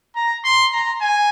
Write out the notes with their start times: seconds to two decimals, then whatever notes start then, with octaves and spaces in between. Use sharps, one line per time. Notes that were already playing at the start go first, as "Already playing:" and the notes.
0.16 A#5
0.45 C6
0.72 A#5
1.01 G#5